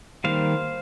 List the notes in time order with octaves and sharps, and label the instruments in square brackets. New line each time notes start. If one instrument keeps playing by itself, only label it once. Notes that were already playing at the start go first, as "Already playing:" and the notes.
[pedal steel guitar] D#3 G3 A#3 C5 F5